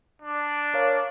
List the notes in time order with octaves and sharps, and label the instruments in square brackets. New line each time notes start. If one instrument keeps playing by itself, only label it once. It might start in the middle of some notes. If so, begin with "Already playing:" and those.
[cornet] D4
[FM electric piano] A#4 C#5 F5